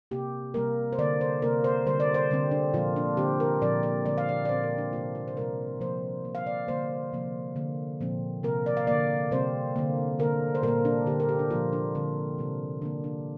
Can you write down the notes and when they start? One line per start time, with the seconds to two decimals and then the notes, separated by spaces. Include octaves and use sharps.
0.11 C3 A#3 G4
0.54 C3 G3 A#3 A#4
0.93 C5
0.98 D3 A#3 D5
1.21 C5
1.42 C3 A#3 A#4
1.64 C5
1.86 D3 G3 A#3 C5
2.00 D5
2.14 C5
2.31 D3 G3 C4
2.51 D4
2.74 A#2 F3 A#3 F4
2.96 D4
3.17 D3 G3 C4 G4
3.40 A#4
3.61 A#2 F3 C4 D5
3.83 D5
4.05 D3 G3 C4 D5
4.18 F5
4.29 D5
4.45 D5
4.49 A#2 F3 C4 C5
4.63 A#4
4.78 D4
4.93 C3 G3 A#3 F4
5.15 F4
5.28 C5
5.37 C3 G3 C4 A#4
5.80 C3 F3 A#3 C5
6.25 C3 A#3
6.35 F5
6.46 D5
6.68 D3 G3 A#3 C5
7.13 C3 F3 A#3
7.56 D3 A#3
8.01 A#2 F3 C4
8.43 C3 A#3 A#4
8.66 D5
8.77 F5
8.87 D3 A#3 D5
9.31 C3 G3 C4 C5
9.76 D3 A#3
10.19 D3 A#3 A#4
10.55 C5
10.63 A#2 G3 A#3 A#4
10.85 D4
11.06 D3 A#3 G4
11.20 A#4
11.29 G4
11.39 D4
11.50 A#2 F3 A#3 F4
11.73 D4
11.95 D3 G3 C4
12.38 C3 G3 C4
12.82 D3 A#3 D4
13.04 D4